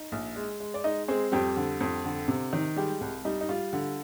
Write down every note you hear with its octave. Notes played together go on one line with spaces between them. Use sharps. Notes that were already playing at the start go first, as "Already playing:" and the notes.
Already playing: D#4
A#1
G#3
G#3
D5
G#3 D#4 D#5
G#3 C4 G#4
F2 G3 G4
D3
F2
D3
C3
D#3
G3 G#3 G4
C2
G3 D#4
D#4
G3 F4
D3